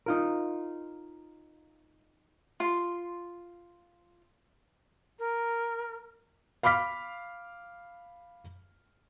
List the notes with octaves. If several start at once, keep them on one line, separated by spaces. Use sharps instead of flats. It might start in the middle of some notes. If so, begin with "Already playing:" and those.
D#4 F4 A#4
F4 C6
A#4
F5 B5 D6 F6 B6